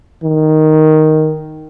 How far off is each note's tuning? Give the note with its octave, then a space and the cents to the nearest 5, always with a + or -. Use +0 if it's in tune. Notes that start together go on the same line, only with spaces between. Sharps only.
D#3 +0